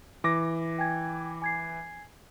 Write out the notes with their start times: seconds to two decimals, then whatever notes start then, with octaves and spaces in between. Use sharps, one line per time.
0.24 E3 D6 A#6
0.78 G5 G#5 G#6
1.42 G#5 G#6 C7